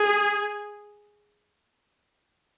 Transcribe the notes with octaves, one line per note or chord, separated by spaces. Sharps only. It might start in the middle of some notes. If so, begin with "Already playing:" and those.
Already playing: G#4